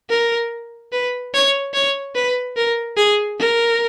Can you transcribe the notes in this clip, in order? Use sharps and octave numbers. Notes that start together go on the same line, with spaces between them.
A#4
B4
C#5
C#5
B4
A#4
G#4
A#4